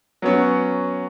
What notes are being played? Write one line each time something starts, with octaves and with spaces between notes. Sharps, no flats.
F#3 B3 C#4